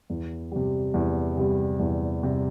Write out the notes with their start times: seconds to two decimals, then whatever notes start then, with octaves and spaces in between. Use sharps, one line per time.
0.10 E2
0.52 C3 G3
0.94 E2
1.37 C3 G3
1.80 E2
2.23 C3 G3